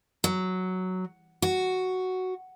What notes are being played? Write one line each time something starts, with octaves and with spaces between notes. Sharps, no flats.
F#3
F#4